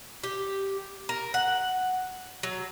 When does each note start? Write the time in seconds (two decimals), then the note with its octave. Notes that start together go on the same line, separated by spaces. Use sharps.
0.23 G4
1.09 A#4
1.34 F#5
2.43 F#3